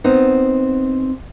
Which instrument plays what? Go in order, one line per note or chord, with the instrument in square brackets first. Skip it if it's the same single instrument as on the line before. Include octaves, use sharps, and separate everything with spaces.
[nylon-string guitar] B3 C4 D#4